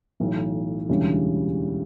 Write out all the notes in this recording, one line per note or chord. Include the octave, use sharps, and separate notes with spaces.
B1 A2 E3
E1 D2 C#3 E3 G3